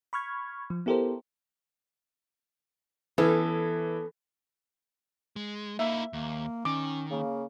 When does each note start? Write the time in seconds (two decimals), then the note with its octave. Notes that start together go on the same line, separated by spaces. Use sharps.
0.13 B5 C#6 F6 G#6
0.70 F3
0.86 B3 E4 G4 A4 A#4 C5
3.18 E3 B3 C#4 A4
5.36 G#3
5.79 A#3 D#4 E4 E5
6.13 D#2 A#3
6.65 D#3 C#4 D6
7.11 C#3 A#3